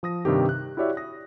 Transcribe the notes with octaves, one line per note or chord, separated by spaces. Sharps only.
F3 D#6 A#6
G2 C3 D#3 G4
F#6
E4 F#4 G4 C#5 D5 E5
D#6 A#6